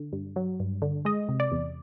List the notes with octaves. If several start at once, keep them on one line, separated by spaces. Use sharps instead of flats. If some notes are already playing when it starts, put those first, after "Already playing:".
Already playing: D3
G2
F#3
G2
D3
G#3 D#5
C3
D5
E2